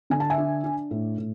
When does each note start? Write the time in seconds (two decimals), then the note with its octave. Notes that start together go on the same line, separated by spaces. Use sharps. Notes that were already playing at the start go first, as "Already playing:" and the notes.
0.10 D3 G#5
0.20 A5
0.30 E5 G#5
0.38 D4
0.64 D4
0.91 A2
1.18 A2